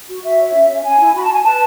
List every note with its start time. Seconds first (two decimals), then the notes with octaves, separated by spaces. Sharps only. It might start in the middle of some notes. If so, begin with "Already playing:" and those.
0.09 F#4
0.23 F#4 E5
0.40 C#5
0.54 C#4
0.70 C#4
0.85 C#4 G#5
0.99 E4
1.15 F#4 B5
1.24 A5
1.30 F#4 G#5
1.43 B4 A5